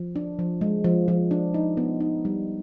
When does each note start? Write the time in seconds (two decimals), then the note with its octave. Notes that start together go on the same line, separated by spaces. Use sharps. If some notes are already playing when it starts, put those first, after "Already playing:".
Already playing: F3
0.16 D4
0.39 F3
0.61 G#3
0.84 F3
1.08 F3
1.31 D4
1.54 D#4
1.77 B3
2.00 D#4
2.25 G3